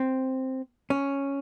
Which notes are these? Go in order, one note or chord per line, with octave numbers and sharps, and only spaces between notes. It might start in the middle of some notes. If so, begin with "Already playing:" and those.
Already playing: C4
C#4